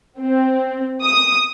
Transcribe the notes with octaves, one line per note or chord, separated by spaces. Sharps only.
C4
D#6